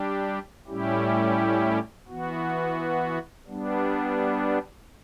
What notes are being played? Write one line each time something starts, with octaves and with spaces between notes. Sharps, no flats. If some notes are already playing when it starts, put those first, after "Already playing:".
Already playing: G3 D4 G4
A2 G3 C#4 E4 G4
E3 B3 F#4
G3 B3 D4